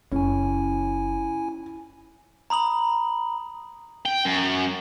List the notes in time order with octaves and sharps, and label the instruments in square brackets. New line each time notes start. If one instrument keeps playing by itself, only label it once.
[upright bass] F#1 [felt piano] C#4 [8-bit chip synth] E4 G#5
[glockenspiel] A#5 B5 D#6 F#7
[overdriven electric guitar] G5
F#2